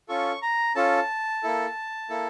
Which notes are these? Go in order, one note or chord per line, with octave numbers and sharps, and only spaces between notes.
C#4 F4 A4 C#6
A#5
C#4 F4 A4 A5
A#3 E4 A4
A#3 E4 A4